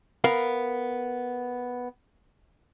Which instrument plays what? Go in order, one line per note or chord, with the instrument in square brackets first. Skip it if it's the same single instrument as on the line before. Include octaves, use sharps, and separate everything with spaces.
[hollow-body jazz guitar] B3 A#4 F5